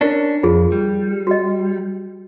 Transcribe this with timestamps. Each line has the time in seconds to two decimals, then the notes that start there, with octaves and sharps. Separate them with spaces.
0.01 C#4 D4 E4 A#4
0.43 F2 F4 G#4
0.72 G3
1.27 F#4 D#5